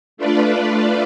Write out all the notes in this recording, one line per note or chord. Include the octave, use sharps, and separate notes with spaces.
A3 D4 F4 B4 D5